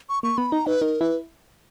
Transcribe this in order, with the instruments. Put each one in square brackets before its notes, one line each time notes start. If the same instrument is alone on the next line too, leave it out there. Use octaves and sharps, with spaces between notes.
[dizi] C#6
[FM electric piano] A#3 [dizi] C#6
[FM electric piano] B3 [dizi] B5
[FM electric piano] D#4 [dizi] A#5
[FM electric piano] D#4 [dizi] B4
[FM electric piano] D#4 [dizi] A#4
[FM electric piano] E4 [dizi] B4